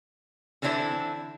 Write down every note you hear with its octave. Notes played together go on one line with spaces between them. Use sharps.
D3 E3 C4 D4 E4